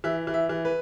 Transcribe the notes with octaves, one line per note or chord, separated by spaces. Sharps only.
E3 E5
E3
E5
E3
B4